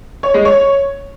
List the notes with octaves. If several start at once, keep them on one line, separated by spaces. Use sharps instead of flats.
C#5
G#3
C#5